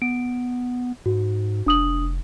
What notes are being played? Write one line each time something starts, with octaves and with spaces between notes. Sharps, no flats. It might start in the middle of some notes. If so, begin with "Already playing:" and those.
B3 D7
G#2 F#4
F1 D4 D#6 F#7